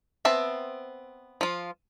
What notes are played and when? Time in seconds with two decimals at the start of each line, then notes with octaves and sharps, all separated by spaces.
0.25 B3 C4 E5 A5
1.41 F3 F4